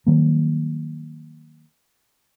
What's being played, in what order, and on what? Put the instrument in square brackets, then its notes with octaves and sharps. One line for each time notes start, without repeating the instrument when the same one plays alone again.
[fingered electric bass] D#3 F#3 G3 A#3